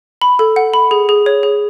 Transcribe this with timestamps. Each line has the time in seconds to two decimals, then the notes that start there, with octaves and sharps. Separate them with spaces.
0.22 B5
0.39 A4
0.56 F#5
0.74 B5
0.91 G#4
1.09 G#4
1.26 C#5
1.43 G#4